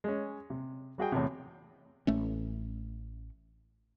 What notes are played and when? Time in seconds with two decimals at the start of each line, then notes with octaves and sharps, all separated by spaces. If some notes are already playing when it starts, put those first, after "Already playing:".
0.04 G#3 C#4
0.50 C3
0.98 G3 F#4 G#4 G5
1.12 E2 A2 C3
2.07 A1 A3 C#4